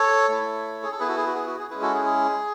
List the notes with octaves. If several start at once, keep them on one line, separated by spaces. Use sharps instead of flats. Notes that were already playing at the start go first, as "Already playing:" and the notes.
Already playing: A4 C#5
A3 E4
G#4
A4
B3 E4 G#4 B4
F#4 A4
G#4
F#4
G#4
F#4
G#4
G#3 C#4 E4 G#4 B4
F#4 A4
G#4
G#4